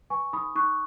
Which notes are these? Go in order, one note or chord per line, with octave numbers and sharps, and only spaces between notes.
B4 G#5 C#6
D#4 B5 D#6
D#4 C#6 F#6